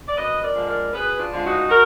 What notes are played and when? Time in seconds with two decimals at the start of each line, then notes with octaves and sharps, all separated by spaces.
0.08 D5
0.16 F#2 B4 D#5
0.42 A#4 D5
0.54 D3 F3 G#3
0.68 A#4 D5
0.93 F#2 G#4 B4
1.18 D4 F4
1.32 D3 F3 G#3
1.44 D#4 F#4
1.70 F#4 A#4